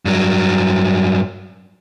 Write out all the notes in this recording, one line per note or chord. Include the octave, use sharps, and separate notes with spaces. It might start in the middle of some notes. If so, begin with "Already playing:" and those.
G2 F#3